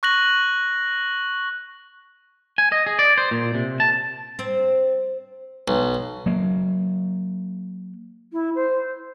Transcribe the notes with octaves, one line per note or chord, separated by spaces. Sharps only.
C#6 F#6 A#6 F#7
G#5
D#5
G#4
D5
C5
A#2
C3
A5
C4
B1
F#3 A#3
E4
C5